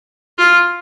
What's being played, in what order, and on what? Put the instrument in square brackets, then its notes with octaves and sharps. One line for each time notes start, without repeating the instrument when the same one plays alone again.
[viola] F4